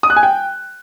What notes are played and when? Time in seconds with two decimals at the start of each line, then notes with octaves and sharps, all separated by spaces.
0.03 D#6
0.10 F#6
0.16 G#5
0.23 G5